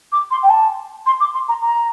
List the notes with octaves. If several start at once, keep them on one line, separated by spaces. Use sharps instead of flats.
D6
C6
G5
A5
C6
D6
C6
A#5
A#5